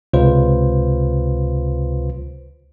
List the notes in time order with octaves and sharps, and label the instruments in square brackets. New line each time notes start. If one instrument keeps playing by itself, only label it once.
[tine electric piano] C#2 C3 F4 B4 C5 F5